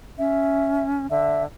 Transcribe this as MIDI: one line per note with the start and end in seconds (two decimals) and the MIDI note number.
0.18 1.07 61
0.18 0.84 76
1.11 1.46 50
1.11 1.43 76